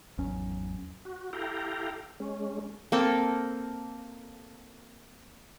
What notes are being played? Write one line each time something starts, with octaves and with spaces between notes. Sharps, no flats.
G#1 E2 F#3 C#4
F#4
E4 G4 A4 F5 G5 A#5
G#3 C#4
A#3 C4 A4